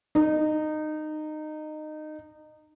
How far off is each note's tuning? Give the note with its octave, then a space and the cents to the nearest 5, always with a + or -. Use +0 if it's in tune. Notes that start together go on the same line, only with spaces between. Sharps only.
D#4 -20